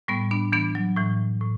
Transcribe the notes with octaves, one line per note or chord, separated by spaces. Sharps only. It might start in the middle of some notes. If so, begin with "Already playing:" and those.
A2 G3 B3
B3 D4
E3 B3 D4
F#3
A2 E3
A2